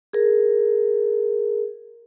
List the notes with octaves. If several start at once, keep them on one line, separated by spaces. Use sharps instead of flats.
G#4 A#4